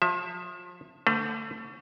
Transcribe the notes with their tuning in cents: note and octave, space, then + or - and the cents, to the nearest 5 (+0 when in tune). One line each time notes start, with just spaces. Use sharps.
F3 +30 E5 +5
D3 +0 A3 +30 B4 +40